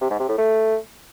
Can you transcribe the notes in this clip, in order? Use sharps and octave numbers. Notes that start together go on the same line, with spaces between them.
C3
G#2
C3
A2
A3